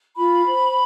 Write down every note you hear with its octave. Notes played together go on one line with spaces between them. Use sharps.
F4 B5
C5